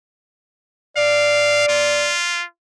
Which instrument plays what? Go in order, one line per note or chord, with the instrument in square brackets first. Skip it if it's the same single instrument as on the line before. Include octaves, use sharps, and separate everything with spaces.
[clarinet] D5 [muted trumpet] F5
[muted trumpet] F4